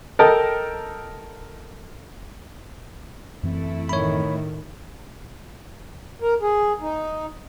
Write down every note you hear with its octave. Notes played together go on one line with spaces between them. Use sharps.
A4 A#4 D#5 G5 A5
F#2 E3 A3 C4 E4
A2 D#3 C#5 B5
A#4
G#4
D#4